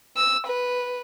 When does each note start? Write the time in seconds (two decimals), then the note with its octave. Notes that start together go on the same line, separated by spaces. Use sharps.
0.17 E6
0.47 B4